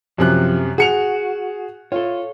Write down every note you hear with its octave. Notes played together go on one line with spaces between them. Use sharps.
F#2 C3 F3 F#6
F#4 G#4 C#7 F7
F4 A4 C#5